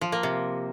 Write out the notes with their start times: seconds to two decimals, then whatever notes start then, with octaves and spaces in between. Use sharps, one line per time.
0.01 F3
0.12 A#3
0.23 C3